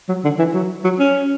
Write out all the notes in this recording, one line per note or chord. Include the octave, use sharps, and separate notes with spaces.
F#3
D3
E3
F#3
F#3
C#4